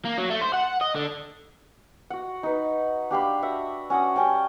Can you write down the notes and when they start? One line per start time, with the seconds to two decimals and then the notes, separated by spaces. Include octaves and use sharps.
0.05 A#3
0.18 F#3
0.30 A3
0.41 C5
0.53 F#5
0.81 D#5
0.95 D3
2.10 F#4 F#5
2.43 D#4 B4
3.10 D4 G4 F5 B5
3.42 F#4 E5 F#5
3.90 C#4 F#4 F#5 D#6
4.16 G3 C#4 G5 A5